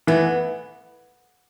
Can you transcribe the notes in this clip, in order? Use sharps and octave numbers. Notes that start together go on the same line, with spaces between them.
E3 B3